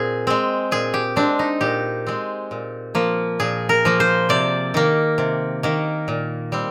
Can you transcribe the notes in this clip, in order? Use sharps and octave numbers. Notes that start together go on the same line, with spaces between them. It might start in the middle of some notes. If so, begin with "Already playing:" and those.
Already playing: A#2 C4 G#4
G#3 C4
A#2 G#4
G4
G#3 C4 D4
D#4
A#2 G4
G#3 C4
A#2
F3 A#3
A#2 G#4
A#4
F3 A#3
C5
C3 D5
D#3 A#3
C3
D#3 A#3
A#2
G3 C4